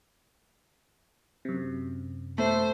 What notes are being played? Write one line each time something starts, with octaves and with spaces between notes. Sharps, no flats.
F#2 C3
A3 C5